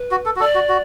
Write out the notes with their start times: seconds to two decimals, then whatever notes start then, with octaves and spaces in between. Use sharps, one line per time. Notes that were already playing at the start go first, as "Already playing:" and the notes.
Already playing: B4
0.11 F#4
0.26 A4
0.36 F#4
0.40 A4 D5
0.55 F#4
0.69 F#4